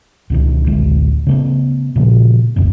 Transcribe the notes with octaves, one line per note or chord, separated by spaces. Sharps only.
C#2 B2 D#3
A1 D2 G#3
C#3 A3 B3
A#2 C#3 F3
F1 C#2 F#2 B2